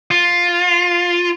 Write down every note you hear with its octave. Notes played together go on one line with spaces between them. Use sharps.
F4